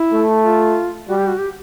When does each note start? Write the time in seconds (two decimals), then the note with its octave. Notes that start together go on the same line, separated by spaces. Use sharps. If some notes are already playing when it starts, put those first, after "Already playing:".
Already playing: E4
0.12 A3
0.44 F4
1.09 G3 F#4
1.18 G4
1.28 F#4
1.39 G4